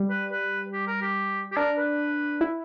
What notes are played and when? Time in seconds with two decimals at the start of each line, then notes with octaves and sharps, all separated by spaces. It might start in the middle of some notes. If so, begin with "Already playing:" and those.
Already playing: G3
0.10 B4
0.32 B4
0.73 G4
0.87 A#4
1.02 G4
1.52 G4
1.57 D4 A#4
1.78 B4
2.41 E4